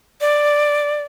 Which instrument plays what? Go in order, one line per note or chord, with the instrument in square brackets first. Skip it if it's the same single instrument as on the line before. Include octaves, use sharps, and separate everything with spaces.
[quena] D5